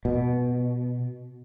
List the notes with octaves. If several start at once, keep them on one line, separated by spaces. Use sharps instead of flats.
B2